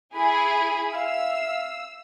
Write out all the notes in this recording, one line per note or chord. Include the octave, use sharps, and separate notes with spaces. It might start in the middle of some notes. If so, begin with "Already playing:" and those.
E4 G#4 B5
E5 F5 E6